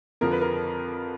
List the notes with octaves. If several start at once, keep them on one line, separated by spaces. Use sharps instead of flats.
F2 D3 F3 A#4
B4
A#4